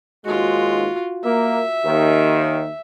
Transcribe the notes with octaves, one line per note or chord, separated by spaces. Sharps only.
D#2 G#2 G#3 F4 F#4
A#3 E5
D#2 D#3